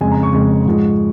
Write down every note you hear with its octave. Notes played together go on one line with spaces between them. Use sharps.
F2 C#3 G#3 G#5
A#5
C#6
F2 C#3 G#3
G#2 F3 G#3